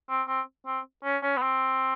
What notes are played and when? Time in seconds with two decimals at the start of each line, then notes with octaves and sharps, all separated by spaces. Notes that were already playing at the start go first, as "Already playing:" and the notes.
0.08 C4
0.27 C4
0.66 C4
1.04 C#4
1.23 C#4
1.37 B3
1.42 C4